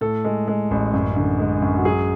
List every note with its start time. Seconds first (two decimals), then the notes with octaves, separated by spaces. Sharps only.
0.01 A2 A4
0.25 G#3
0.48 G#3
0.71 A1
0.93 F#2
1.16 D3
1.39 G#3
1.62 F#2
1.77 F#4
1.85 F#3 G#4